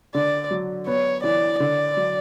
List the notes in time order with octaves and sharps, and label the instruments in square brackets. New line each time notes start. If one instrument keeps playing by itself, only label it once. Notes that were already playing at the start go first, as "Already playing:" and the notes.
[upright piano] D3 [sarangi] D5
[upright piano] F#3
[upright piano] B3 [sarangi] C#5
[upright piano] E3 [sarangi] D5
[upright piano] D3 [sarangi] D5
[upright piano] F#3